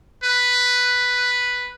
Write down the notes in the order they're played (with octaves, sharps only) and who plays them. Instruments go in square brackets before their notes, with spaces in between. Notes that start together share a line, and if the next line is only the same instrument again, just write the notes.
[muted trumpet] B4